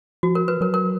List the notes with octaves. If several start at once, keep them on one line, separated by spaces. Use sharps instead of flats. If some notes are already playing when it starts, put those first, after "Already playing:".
F3 F#4
A#4
B4
F#3 A#4
A#4